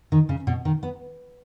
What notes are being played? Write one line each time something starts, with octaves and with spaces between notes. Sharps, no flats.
D#3
C#3
B2
D#3
B3